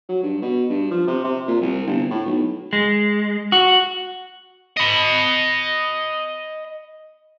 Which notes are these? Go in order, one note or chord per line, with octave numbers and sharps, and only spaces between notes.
F#3
G2
B2
G2
F3
C3
C3
A#2
C2
G1
A2
B1
G#3
F#4
D#5 B5